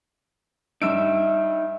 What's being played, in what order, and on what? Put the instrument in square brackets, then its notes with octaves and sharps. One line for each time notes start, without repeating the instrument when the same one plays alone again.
[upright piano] G2 E6 D7 [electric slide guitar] D#4 E5